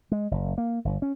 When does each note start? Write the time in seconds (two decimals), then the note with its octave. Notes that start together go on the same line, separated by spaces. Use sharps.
0.11 G#3
0.31 F#1
0.58 A#3
0.85 G1
1.02 C#4